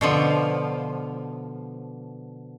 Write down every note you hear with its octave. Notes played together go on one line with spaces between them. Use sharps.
B2 D3 F3